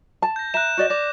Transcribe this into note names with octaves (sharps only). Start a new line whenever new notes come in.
A5
G6 A#6
E5 A#5 F#6 E7
F#4 D5 D#5
D5 D6 A#6